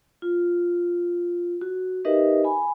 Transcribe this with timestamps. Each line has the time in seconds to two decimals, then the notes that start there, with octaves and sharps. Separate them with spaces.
0.22 F4
1.61 F#4
2.05 D#4 G4 A#4 B4 D#5 E5
2.44 G#5 B5